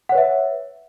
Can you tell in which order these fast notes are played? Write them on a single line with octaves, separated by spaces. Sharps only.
F#5 C#5 B4 E5